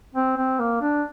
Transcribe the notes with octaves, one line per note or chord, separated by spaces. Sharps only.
C4
C4
A#3
D4